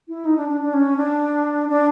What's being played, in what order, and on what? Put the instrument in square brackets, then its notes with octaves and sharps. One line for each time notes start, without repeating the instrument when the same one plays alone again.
[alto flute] E4
D#4
D4
D4
D4
C#4
D4
D4